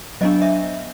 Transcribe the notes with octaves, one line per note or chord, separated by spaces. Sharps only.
F#3 B3 D4 D#5
E5